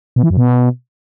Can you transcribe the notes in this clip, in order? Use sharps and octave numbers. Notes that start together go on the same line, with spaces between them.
B2
E3
F#2
B2